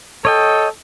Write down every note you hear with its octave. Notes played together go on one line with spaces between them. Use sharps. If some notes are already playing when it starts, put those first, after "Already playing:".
A4 C#5 D#5 G5